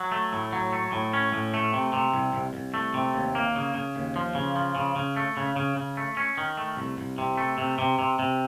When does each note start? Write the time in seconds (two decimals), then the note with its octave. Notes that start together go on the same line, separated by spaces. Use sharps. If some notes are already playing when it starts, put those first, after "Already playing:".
Already playing: F#3
0.12 A3
0.33 A2
0.53 F#3
0.73 A3
0.92 A2
1.13 C#4
1.33 A2
1.54 A3
1.73 C3
1.93 C3
2.14 C2
2.33 C2
2.54 C2
2.74 A3
2.94 C3
3.15 D#2
3.35 A#3
3.56 C#3
3.75 C#3
3.96 D#2
4.16 F3
4.35 C#3
4.56 F3
4.76 C#3
4.96 C#3
5.16 A3
5.37 C#3
5.56 C#3
5.76 C#3
5.97 A3
6.17 C#4
6.38 D#3
6.57 A3
6.77 C2
6.98 C2
7.18 C3
7.38 A3
7.58 C3
7.79 C3
7.99 C3
8.19 C3